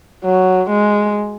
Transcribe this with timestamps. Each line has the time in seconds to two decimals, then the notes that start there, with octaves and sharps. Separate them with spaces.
0.25 F#3
0.70 G#3